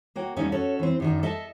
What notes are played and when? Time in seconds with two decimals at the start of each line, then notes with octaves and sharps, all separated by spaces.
0.16 A#3 F#4 C#5 G5
0.36 D3 G3 A3 C#4 D#4 F5
0.52 C#4 F#4 A4 C#5
0.79 E3 C4
1.00 F#2 D#3 D4
1.23 A4 D#5 E5 A5